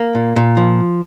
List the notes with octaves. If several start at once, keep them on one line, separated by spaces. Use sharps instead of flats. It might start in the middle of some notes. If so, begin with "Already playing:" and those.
Already playing: A#3
A#2
A#2
F3